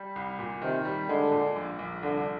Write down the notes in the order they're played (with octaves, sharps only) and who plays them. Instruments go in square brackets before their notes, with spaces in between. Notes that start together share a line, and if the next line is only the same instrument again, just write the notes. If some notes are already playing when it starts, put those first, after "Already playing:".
Already playing: [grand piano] G3
C2
A#2
[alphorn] C3 [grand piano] D#3
[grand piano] G3
[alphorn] D3 [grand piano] G#3
[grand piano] A#2
A#1
A#1
[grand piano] C2 [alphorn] D3